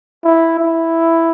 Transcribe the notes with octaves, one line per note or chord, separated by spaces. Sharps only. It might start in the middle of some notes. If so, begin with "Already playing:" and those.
E4
E4